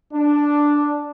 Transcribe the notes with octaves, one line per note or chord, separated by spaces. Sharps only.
D4